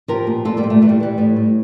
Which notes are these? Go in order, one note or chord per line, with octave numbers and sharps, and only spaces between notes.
F3 G4 A#4
A#2
A#2 F4 A4
G3 A#3
A#2
A3
E3 A3
G3
E3 G3
A2
A2